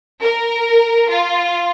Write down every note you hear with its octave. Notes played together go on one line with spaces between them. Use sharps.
A#4
F4